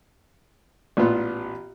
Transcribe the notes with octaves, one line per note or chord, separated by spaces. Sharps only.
A1 A#2 B3 F4